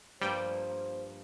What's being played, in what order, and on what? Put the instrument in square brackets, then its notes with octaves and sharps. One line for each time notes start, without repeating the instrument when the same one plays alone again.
[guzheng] G2 F3 A#3 [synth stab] G3 G5 [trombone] C5